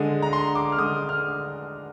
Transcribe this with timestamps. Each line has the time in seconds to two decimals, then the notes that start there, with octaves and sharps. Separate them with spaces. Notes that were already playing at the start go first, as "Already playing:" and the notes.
Already playing: D3 G#3 D#6
0.22 A#5
0.33 C6
0.55 D6
0.72 F6
0.78 D3 G#3 D#6
1.09 F6